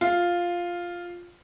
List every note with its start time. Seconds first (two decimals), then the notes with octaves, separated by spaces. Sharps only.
0.01 F4